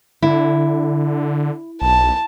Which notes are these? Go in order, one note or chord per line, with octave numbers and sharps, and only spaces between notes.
D3 E4
B1 A5